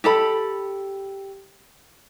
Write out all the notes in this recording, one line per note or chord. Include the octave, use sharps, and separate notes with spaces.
G4 A4 B5